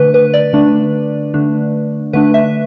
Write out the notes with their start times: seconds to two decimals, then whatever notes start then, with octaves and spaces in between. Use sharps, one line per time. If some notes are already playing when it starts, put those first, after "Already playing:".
Already playing: D3 A3 D4 B4
0.14 B4
0.34 D5
0.53 D3 A3 D4
1.34 D3 A3 D4
2.13 D3 A3 D4 B4
2.34 E5